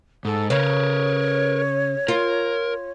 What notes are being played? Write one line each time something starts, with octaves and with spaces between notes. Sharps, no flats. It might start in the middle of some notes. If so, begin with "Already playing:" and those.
G#2 A4
C#3 A#4 B4 C#5
F4 A#4